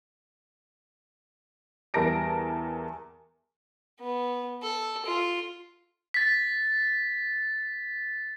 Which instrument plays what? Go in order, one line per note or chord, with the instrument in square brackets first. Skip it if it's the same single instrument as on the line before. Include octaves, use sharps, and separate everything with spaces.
[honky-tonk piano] E2 G3 A#4 A5 A#6 D7
[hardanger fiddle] B3
A4
F4
[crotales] A6 B6